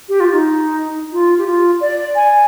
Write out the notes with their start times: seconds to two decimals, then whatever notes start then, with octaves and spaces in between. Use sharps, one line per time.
0.09 G4
0.20 F4
0.32 D#4
1.12 F4
1.38 G4
1.47 F4
1.81 D5
2.16 G#5